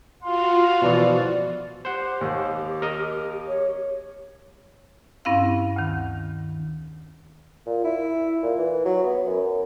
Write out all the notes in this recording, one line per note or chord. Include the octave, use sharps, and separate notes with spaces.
F4 F#4 F5 C6
B2 E3 F3 D5
G4 C5 F#5
D#2
A#4 D#5
C#5
G2 C4 C#4 E4 F5
D2 D#3
A#2
E4
A#2
E3
F#3
B3
F#2